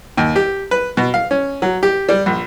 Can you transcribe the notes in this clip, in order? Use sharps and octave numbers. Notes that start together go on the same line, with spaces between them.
D#2
G4
B4
B2
F5
C#4
F#3
G4
G3
A#1